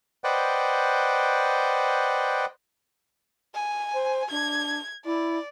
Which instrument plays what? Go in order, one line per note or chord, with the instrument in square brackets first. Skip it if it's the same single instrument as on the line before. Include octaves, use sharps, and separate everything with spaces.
[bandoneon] B4 C5 D5 D#5 F#5 G5
[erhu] G#5
[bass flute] C5
[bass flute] D4 [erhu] G#6
[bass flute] E4 [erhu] D5